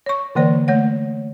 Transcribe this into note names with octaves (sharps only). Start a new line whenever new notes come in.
C#5 C#6
D3 E3 A#3 C5 D5
A3 C#5 F#5